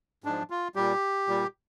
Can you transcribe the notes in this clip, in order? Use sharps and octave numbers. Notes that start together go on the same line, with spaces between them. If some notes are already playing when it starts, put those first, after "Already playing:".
G#2 F3 D4
F4
A#2 G3 G4
A#2 G3